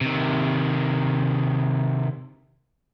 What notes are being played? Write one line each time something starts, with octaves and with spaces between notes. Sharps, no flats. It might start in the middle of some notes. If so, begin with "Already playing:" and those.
C3 D#3